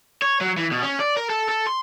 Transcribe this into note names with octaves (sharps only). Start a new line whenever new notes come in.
C#5
F#3
E3
B2
C#4
D5
A#4
A4
A4
C6